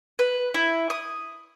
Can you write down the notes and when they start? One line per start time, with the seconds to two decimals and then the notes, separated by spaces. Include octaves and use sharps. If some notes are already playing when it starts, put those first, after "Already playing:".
0.19 B4
0.54 E4
0.90 D#6